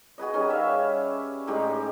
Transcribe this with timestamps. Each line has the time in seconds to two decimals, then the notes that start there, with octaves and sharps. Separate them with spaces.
0.18 F#4 G#4 B4 D#5
0.34 D#3 G3 C#4
0.50 E5 F5
1.47 A2 G#3 D#4 G4